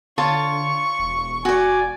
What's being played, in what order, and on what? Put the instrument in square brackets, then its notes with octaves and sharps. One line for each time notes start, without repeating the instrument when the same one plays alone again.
[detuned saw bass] D3 [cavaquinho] F4 C#5 A5 [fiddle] C#6
[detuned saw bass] E1
[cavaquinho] F#4 D5 [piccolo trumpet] G#5